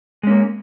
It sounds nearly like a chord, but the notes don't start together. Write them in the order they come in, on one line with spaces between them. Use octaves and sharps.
G#3 C#4 A#3